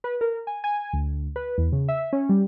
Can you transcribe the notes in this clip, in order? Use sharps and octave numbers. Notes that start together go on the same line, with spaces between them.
B4
A#4
G#5
G#5
D2
B4
E2
C#3
E5
C#4
G3